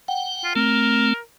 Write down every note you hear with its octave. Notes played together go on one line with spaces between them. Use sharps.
F#5 G5
F4
A3 C4 A#4